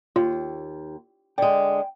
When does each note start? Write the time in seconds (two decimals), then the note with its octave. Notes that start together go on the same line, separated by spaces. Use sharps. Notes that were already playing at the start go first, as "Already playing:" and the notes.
0.16 D#2 F4
1.38 D3 G#3 G5